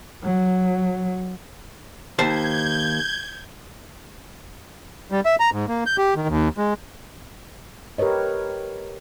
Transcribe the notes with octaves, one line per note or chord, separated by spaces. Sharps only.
F#3
D#2 C5 A5 G6 G#6
G3
E5
A#5
G#2
A#3
G6
G4
D#3
D#2
G#3
G4 A#4 B4 C#5 D#5